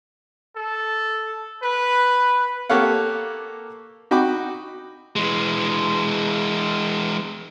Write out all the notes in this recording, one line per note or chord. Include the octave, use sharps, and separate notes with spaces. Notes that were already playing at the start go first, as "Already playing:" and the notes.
A4
B4
A#3 G4 A4 C#5 F5 F#5
D#4 F#4 G5 B5 D6
E3 G#3